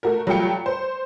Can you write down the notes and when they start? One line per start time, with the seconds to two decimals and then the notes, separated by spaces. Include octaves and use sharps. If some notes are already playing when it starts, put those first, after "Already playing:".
0.03 A3 F#4 A#4
0.27 F#3 G3 A3 F4 G5 C#7
0.66 C5